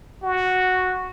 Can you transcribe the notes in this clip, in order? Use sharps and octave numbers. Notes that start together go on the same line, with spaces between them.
F#4